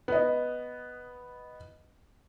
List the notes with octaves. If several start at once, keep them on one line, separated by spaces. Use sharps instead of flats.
B3 D#5